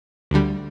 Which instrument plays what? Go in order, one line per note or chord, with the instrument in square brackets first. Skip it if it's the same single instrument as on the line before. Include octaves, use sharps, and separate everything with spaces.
[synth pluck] D2 D3 G3